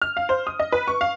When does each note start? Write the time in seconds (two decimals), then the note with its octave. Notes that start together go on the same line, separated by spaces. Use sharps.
0.02 F6
0.17 F5
0.29 C5
0.47 D#6
0.59 D#5
0.72 B4
0.87 C#6
1.01 F5